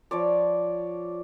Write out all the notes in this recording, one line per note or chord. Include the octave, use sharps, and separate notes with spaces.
F3 C#5 D5